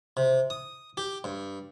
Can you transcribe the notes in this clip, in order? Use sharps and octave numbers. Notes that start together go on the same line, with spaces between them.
C3
D#6
G4
G2